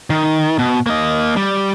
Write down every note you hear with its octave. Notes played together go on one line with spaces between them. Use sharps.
D#3
B2
A#3 D#5
G3